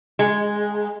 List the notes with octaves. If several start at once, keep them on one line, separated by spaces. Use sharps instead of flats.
G#3